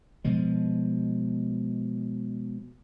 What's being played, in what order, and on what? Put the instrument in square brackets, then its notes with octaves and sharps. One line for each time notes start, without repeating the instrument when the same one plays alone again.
[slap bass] B2 F3 G#3